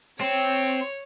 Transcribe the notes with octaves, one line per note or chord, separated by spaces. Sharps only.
C4 C#5